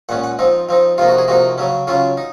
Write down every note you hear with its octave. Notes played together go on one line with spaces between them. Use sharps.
A#2 G#3 C#4 F#5
F#5
F3 C4 D#4
F3 C4 D#4
C3 F3 A#3 D#4 F4
F#4
G#4
C3 F3 A#3 D#4 F#4
C#3 F#3 C#4
C#3 F#3 C#4 F4
D#4